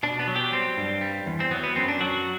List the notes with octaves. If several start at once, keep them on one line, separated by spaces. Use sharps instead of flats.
B2 D4
B3
F#3
G4
G3 C4
G2
G3
E2
C4
F#3 B3
B3
F#2 C4
D4
F#3 F#4